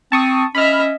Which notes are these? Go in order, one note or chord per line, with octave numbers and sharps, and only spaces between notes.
C4 A5 C#6 D#6
C#4 D#5 E5 B5 F6